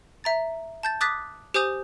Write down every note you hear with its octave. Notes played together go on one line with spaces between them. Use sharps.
E5 A#5 A6
A5 G6 A6
D6 D#6 F#6 A6 B6
G4 C5 G#5 D#6 G6 F7